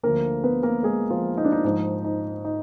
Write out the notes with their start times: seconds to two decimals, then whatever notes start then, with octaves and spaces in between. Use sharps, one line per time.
0.03 D2 D3 F3 A#3 A#4
0.44 B3 B4
0.63 A#3 A#4
0.83 G#3 G#4
1.10 F3 F4
1.37 D#4
1.45 D4
1.52 D#4
1.64 G#2 F3 D#4
2.04 D#4
2.45 D#4